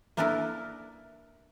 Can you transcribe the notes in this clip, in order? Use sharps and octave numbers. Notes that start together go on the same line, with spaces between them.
A#3 B3 D4 E4 A4 A#4